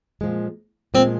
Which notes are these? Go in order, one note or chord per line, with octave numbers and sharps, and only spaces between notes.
A#2 F3 G#3
A#2 F3 G#3 C4